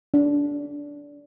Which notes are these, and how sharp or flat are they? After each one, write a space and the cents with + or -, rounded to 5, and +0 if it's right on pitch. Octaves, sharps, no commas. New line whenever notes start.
D4 -20